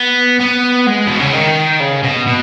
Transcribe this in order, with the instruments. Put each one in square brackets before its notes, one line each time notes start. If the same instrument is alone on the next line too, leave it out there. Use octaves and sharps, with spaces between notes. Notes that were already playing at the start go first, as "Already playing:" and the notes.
Already playing: [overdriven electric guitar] B3
B3
G#3
B2
C#3
D#3
C#3
B2
B2